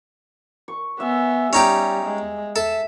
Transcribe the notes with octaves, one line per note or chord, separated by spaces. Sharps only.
C#6
B3 E5 G#5
G3 C#4 D#4 G4
G#3
A4 E5